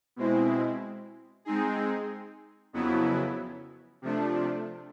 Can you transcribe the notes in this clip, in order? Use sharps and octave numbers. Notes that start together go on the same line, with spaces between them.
B2 G#3 C4 E4
G#3 C4 D#4 G#4
F2 C#3 F#3 B3 E4
C3 F3 A3 D4